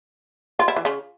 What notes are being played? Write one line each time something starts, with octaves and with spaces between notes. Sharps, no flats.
F4
E4
E3
C#3